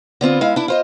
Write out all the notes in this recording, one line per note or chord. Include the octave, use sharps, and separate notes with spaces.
D3 B3 C4 F4
G#3 E4 F5
D4 E4
F4 C5 D#5